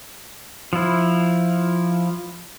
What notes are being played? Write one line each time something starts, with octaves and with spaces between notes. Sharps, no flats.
F3 E4